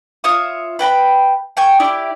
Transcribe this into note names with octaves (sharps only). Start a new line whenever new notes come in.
F4 C#5 E5 D#6
B4 G5 A#5 B5
G5 G#5 C#6
E4 G4 D5